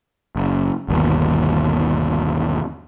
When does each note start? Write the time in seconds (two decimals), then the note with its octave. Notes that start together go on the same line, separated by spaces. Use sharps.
0.36 F#1
0.88 G1 D#2 B2